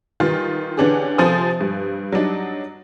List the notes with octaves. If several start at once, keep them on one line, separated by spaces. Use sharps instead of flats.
D#3 E3 G3 F4
D3 E3 C#4 D4 G4 G#4
C3 F3 A4 C5 G#5 D#6
G2
F#3 G3 D4 D#4